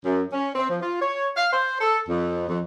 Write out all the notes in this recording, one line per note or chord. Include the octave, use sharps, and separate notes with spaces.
F#2
C#4
C4
F3
F4
C#5
F5
C5
A4
F2
F2